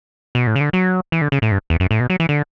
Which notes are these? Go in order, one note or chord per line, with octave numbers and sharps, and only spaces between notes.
B2
A2
C#3
D3
F#3
E3
D3
C#3
A2
G2
E2
F#2
A2
B2
F#3
E3
D3